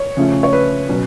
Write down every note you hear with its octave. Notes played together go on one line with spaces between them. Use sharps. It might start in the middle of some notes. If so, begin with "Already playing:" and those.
Already playing: C#5
C#3 F3 A3 C#4
C#5
B4
B2 F#3 C#4